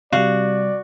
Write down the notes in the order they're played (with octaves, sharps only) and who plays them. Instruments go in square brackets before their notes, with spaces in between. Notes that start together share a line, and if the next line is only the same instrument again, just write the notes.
[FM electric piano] C3 G3 [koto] F#4 [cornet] D5 [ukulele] F5